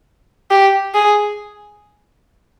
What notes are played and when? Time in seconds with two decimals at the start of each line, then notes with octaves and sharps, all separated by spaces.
0.51 G4
0.95 G#4